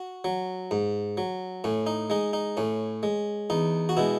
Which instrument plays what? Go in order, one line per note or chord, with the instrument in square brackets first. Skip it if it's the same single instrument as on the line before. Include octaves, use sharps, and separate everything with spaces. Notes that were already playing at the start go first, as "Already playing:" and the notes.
Already playing: [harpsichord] F#4
F#3
G#2
F#3
A2 C#4
D#4
G#3 D#4
D#4
A2 C#4
G#3
E2 D#4
F#4
B2 G#3 E4